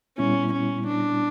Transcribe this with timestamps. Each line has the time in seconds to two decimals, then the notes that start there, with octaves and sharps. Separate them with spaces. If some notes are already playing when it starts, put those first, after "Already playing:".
0.18 A#2 G3 B3 C#4 E4
0.52 C#4
0.87 D4